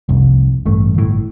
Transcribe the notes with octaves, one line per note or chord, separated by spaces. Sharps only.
F1 C2
A1 G2 A3
G1 A2